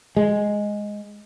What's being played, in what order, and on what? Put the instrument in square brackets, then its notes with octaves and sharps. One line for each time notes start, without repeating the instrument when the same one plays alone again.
[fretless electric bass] G#3